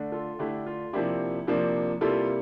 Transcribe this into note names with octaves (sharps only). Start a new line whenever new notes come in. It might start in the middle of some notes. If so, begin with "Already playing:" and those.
Already playing: D3 A3 D4
F4 A4
D3 A3 D4 E4 G4
F4
C3 F3 A#3 D4 E4 G4
C3 F3 A#3 D4
C3 G3 A#3 E4 F4 A4